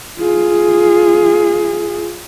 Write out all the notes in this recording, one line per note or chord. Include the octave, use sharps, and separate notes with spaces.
F4 G#4